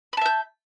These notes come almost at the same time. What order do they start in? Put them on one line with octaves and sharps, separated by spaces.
B5 A5 E5 G6